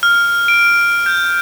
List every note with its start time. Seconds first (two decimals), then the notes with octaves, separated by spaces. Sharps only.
0.03 F6
0.48 D7
1.06 G6